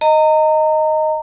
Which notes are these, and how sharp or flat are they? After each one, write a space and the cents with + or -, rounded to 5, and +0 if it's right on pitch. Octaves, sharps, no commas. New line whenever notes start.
D#5 +0 A#5 -30